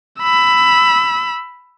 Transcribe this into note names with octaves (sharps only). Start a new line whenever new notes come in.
B5 E6